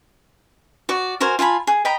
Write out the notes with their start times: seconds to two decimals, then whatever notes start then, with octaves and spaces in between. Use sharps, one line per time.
0.89 F#4 D5
1.20 F#4 A#4 C5 G#5
1.39 F4 G#5 A5 B5
1.67 G#4
1.85 D#5 G5 A#5 B5